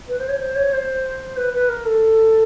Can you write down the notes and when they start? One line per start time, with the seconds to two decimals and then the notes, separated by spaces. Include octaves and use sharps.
0.08 B4
0.19 C5
0.29 C#5
0.39 C5
0.56 C#5
0.73 C5
1.37 B4
1.53 B4
1.69 A#4
1.85 A4